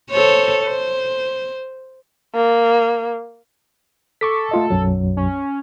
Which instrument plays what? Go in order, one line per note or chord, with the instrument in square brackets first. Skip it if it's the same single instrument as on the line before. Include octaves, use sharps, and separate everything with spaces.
[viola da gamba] A4 C5 C#5
C5
[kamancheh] A#3
[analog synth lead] A4 [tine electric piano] C#6 D6 B6
[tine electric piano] A3 F4 D#5
B1 F#2 F#3
[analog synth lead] C#4